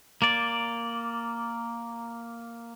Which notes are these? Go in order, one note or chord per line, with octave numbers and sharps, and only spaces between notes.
A#3 D5